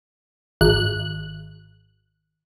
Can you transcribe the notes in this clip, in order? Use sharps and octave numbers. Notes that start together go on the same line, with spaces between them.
G#1 F#6